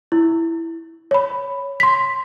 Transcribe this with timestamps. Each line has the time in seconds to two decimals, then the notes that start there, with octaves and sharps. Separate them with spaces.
0.12 E4
1.11 C#5 B5
1.80 C6 B6